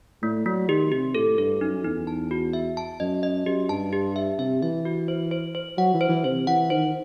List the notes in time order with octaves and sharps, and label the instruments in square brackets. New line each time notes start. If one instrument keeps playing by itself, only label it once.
[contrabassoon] A2 [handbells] A3
[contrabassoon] F#3 [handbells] A3
[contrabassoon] D#3 [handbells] G4
[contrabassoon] C3 [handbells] G4
[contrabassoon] A2 [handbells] A4
[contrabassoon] G2 [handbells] A4
[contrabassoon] F#2 [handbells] D#4
[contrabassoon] E2 [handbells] D#4
[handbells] A5
F#4
E5
A5
[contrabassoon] F#2 [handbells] D#5
[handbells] D#5
[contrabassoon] F#2 [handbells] G4
[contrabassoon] G2 [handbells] A5
[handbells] G4
E5
[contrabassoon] C3 [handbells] E5
[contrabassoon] E3 [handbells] E5
[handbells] F#4
C5
C5
C5
[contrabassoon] F#3 [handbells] F#5
[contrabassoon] E3
[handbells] C5
[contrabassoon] E3
[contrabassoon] C3 [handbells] C5
[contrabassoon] E3 [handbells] F#5
[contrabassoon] D#3 [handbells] C5